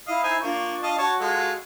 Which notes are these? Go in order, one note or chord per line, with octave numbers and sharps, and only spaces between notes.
E4 D#5 F5
D#4 C5 G#5
A#3 D4 F4 C#6
D#5 F5 A5
F#4 C#5 A5
G#3 F4 A4